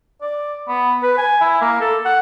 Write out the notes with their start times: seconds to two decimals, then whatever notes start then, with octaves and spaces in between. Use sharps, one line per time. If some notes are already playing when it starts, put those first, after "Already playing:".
0.21 D5
0.68 B3
1.03 B4
1.18 G#5
1.41 E4
1.61 A#3
1.81 A4
2.05 F#5